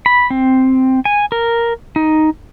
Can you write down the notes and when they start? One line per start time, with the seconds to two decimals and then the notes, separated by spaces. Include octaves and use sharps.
0.06 B5
0.30 C4
1.05 G#5
1.32 A#4
1.96 D#4